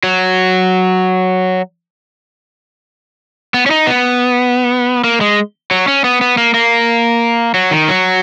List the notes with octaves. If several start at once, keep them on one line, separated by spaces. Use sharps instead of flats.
F#3
B3
C#4
D#4
B3
A#3
G#3
F#3
C#4
B3
B3
A#3
A#3
F#3
D#3
F#3